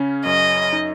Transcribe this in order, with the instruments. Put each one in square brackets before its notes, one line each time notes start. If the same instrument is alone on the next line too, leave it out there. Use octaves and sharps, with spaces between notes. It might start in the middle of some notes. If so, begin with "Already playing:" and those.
Already playing: [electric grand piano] C#3 C#4
[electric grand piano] F#2 [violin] D#5
[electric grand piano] D#4